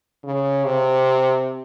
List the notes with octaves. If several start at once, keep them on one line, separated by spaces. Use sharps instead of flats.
C#3
C3